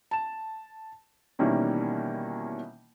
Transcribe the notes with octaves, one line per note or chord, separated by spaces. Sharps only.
A5 E7
B2 D#3 E3 G3 A#3 C#4